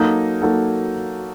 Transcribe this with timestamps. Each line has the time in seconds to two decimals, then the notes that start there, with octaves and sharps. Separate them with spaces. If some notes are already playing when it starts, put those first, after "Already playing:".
Already playing: F#3 A#3 D#4 F#4 A4
0.42 F#3 A#3 D#4 F#4 A4